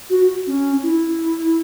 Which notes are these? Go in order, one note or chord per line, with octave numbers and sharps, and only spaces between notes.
F#4
C#4
E4